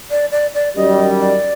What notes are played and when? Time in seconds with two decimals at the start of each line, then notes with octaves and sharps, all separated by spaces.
0.10 D5
0.31 D5
0.54 D5
0.76 F#2 D#3 G3 D#5
1.20 D5